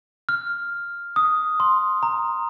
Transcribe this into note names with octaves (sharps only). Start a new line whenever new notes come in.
F6
D#6
C6
A#5